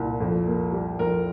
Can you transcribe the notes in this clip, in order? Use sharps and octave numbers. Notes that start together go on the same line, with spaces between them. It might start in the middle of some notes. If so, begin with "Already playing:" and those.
Already playing: C2 A#2
F2
A#3
G3
F2 A#4